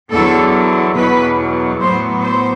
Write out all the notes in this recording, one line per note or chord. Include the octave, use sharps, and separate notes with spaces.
E2 D3 F#3 A4
E2 B2 F#3 B4
A2 F#3 B3 C5
C5